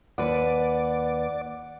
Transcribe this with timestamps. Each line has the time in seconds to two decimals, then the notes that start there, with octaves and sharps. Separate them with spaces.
0.18 D#2 B4 D5 F#5